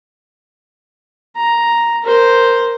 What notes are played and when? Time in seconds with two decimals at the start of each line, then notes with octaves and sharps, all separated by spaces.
1.36 A#5
2.03 A#4 C5